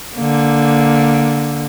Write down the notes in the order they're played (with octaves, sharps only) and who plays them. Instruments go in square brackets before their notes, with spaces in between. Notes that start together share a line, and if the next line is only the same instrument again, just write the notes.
[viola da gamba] D3 A#3